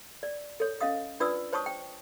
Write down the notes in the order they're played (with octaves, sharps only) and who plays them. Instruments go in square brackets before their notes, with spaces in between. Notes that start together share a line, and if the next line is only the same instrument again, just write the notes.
[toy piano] D5
A4 C#5
C#4 D#5 F5 D#6
D4 F4 B4 D5 D#6 E6
C5 C#5 A5 C#6 D#6
G5